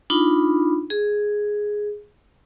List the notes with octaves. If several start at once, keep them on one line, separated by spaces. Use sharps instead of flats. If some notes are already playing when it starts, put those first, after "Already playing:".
D4 D#4 F4 B5
G#4